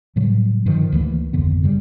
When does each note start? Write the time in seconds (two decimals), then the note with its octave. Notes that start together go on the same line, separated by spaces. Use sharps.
0.16 A2 C#3 F#3 G3
0.66 G2 D3 D#3 F3
0.92 D2 E3 F3 A#3
1.33 G#1 F2 D3 B3
1.63 G2 C#3 G3